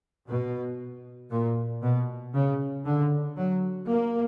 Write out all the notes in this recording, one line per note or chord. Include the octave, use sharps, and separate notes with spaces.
B2
A#2
B2
C#3
D3
F#3
A#3